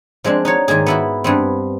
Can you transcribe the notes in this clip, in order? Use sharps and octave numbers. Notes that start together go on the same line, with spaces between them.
F3 G#3 C4 D4
D#4 F#4 C#5
G#2 D#3 A#3 G#4
B3 E4 F#4
G2 B3 C4